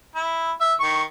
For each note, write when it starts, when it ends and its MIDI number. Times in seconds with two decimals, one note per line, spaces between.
0.16 0.51 64
0.61 0.73 76
0.81 1.03 51
0.81 1.03 85